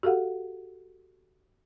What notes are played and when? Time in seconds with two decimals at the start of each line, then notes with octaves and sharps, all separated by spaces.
0.03 F#4 G4 A4 F5 F#5